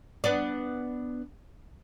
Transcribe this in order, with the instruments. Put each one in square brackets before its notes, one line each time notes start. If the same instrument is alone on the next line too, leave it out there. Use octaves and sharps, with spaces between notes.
[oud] B3 D4 D5